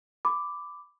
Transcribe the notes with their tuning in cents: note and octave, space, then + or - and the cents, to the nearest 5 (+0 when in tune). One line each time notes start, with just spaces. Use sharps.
B5 +20 D6 +0